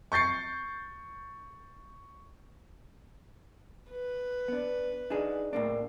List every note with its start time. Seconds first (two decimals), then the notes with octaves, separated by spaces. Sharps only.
0.12 C#6 G6 A6 C7 C#7
3.91 B4
4.48 B3 D4
5.10 D4 D#4 G#4
5.53 A2 A#3 D4